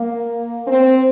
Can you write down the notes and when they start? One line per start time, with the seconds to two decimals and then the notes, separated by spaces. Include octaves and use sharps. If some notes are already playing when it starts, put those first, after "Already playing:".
Already playing: A#3
0.68 C4